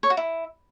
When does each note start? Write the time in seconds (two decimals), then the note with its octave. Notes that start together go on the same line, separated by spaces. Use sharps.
0.03 C#5
0.10 F#4
0.17 E4